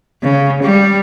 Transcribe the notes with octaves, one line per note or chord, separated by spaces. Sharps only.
C#3
G3